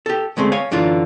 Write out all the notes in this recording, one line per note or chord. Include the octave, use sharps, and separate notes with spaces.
G4 A4
D2 G#3 A3 C4
C#5 F5 G#5
F#2 D3 E3 D4 F4